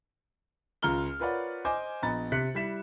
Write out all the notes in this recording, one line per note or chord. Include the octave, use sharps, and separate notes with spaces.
C#2 F4 A#5 F6 G7
F4 A#4 B4 C#5 D5 F#5
C5 D#5 G#5 D6
A#1 B3 D#5 A#5 B5 A6
C3 F#6 B6 C#7
G3 E4 B6 E7